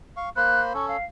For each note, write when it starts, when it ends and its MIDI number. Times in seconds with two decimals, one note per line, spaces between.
0.17 0.29 77
0.17 0.29 85
0.37 0.73 58
0.37 0.73 72
0.37 0.73 83
0.37 0.61 90
0.74 0.97 61
0.74 0.97 69
0.74 0.86 85
0.88 1.05 77